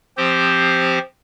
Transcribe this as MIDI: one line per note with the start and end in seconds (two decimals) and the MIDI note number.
0.17 0.99 53
0.17 0.99 60
0.17 0.99 67
0.17 0.99 72